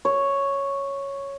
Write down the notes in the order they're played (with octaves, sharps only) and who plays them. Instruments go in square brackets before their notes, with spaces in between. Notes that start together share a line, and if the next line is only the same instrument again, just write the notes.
[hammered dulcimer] C#5